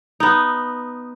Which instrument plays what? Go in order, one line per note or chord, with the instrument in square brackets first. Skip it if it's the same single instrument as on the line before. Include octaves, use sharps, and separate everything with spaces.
[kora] B3 D#4